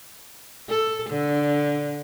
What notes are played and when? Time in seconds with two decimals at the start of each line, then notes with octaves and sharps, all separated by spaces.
0.69 A4
1.10 D3